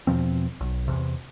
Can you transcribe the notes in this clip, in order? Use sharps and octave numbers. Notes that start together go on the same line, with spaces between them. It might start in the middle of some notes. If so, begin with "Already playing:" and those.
E2 B2 F3 C4
B1
E2 C3